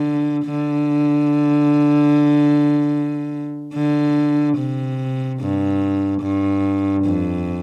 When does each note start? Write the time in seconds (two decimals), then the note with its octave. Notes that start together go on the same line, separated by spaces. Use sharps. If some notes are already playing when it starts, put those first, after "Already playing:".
Already playing: D3
0.45 D3
3.75 D3
4.58 C3
5.40 G2
6.22 G2
7.05 F2